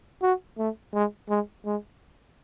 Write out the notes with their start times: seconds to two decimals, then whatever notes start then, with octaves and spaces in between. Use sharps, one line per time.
0.22 F#4
0.58 A3
0.94 G#3
1.29 G#3
1.65 G#3